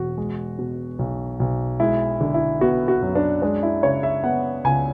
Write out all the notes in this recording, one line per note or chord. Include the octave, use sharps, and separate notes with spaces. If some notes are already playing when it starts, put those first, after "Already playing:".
Already playing: E1 F#4
G#3
B2
B1
B1
G#3 E4
D3
E4
B3 F#4
F#4
F#2
D4
G#3 D4
E4
C#3 C#5
E5
B3 F#5
C#2 G#5